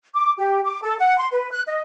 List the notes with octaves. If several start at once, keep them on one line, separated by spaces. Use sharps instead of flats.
D6
G4
D6
A4
F#5
C6
B4
F#6
D#5